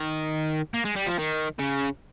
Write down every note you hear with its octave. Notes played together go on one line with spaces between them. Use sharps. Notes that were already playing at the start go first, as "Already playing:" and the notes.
Already playing: D#3
A#3
G#3
G3
F3
D#3
C#3